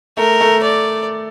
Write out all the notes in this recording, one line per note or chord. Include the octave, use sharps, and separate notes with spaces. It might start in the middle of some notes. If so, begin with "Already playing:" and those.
A3 A#4
A3
D5